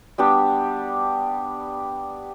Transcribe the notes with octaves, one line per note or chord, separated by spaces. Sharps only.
G3 B3 D4 G4